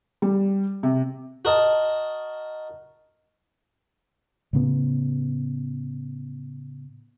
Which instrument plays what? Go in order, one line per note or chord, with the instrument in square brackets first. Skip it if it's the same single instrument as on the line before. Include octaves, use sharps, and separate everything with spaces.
[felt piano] G3
C3
[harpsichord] F#4 A#4 D#5 A5
[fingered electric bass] A2 C#3 B3